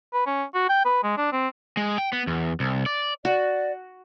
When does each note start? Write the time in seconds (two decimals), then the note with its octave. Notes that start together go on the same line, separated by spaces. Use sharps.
0.13 B4
0.27 C#4
0.54 F#4
0.69 G5
0.85 B4
1.04 G#3
1.18 D4
1.32 C4
1.77 G#3
1.98 G5
2.13 B3
2.27 E2
2.60 C2
2.86 D5
3.25 F#4 D5